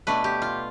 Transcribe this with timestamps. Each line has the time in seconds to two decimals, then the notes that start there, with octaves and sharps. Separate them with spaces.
0.07 B2 A3 D4 B4
0.24 G4
0.42 F4